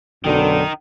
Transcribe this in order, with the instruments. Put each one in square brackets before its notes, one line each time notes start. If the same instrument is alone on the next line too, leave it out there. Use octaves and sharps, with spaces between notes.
[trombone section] B1 F#2 D3 [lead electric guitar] D#3 D#4